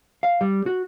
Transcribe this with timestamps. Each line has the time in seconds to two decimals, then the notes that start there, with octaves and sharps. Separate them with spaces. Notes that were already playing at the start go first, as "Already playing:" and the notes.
0.23 F5
0.41 G3
0.66 F#4